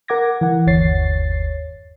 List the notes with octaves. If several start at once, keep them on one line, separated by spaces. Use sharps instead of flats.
A#4 F#5 D6 G#6 A#6
E3 F#5
G1 D#2 C#5 A6 C7